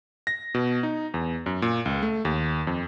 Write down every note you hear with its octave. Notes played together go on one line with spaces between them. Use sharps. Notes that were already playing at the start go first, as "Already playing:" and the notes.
A#6
B2
D#4
E2
F#2
A#2
C#2
A3
D#2
F2